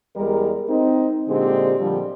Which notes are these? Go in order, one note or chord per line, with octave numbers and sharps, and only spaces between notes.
E2 G3 G#3 A#4
C4 D#4
A#2 D3 G#3 C4 G4
A#2 D3 F3 G3